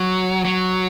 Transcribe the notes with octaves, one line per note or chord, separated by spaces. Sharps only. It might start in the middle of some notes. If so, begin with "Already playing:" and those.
Already playing: F#3
F#3